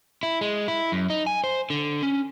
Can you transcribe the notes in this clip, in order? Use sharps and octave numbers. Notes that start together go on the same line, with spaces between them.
E4
G#3
E4
F#2
D#4
G#5
C5
D3
C#4